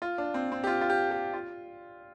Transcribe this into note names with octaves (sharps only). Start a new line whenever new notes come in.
F4
D4
C4
C4
G4
F4
F4
G4
G4
F4